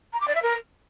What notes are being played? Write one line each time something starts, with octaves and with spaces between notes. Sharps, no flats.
A#5
D6
D5
E5
A#4